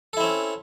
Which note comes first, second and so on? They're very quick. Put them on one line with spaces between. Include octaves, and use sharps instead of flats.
A4 E4 C4 C#4